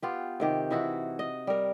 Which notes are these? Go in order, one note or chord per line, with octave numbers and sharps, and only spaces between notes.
B3 F4 G4
C3 D#3 G4
E3 D#4 E4 F#4
D#5
G3 A#4